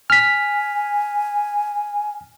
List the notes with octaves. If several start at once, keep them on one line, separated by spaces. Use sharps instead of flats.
G#5 F6 B6